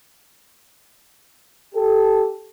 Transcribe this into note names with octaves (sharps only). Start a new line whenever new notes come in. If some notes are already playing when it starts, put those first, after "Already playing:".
G4 A4